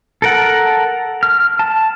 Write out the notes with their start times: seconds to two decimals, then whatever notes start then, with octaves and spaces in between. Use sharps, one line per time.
0.22 A4 A#4 F#5
1.23 F6
1.59 A5